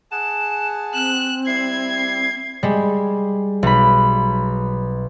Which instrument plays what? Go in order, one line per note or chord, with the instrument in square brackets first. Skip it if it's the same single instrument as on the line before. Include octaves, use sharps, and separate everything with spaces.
[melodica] G#4 F#5 A5 [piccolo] E7
[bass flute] C4 [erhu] F#6 [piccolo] E7
[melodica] G3 E4 [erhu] G#6 [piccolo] C7
[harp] G3 G#3
B1 B5